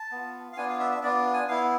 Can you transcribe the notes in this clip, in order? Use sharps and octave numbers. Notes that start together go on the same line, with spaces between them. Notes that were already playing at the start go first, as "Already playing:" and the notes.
Already playing: A5
B3 F4
F5
B3 D4 F4 G#5
F5
E5
E5
B3 D4 F4 D5
G#5
B3 E4 F5